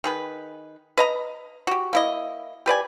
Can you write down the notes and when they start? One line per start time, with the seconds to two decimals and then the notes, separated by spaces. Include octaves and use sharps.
0.04 D#3 G#4 B4
0.98 B4 D#5 A#5
1.67 F#4 G4
1.93 A#3 E4 D#5
2.66 G4 B4 D5 G#5